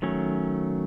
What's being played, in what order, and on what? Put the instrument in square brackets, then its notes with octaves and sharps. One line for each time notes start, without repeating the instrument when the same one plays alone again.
[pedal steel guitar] D#3 F#3 A3 C#4